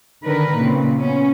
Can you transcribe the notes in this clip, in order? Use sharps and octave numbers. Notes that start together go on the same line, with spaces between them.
D3 D#3 A#4 B4
A#2 C#3 C4
B3 C#4